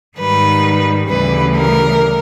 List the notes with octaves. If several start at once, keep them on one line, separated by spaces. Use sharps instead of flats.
G#2 D#3 G3 B4
D2 C#3 E3 G3 B4
A#4